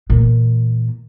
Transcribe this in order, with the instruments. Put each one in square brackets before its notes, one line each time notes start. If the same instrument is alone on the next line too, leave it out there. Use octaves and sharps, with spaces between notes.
[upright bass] A#2 E3